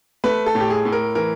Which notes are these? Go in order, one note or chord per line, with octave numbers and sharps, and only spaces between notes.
A3 B4
A4
A2
G4
G#4
A2
A#4
E3 A#4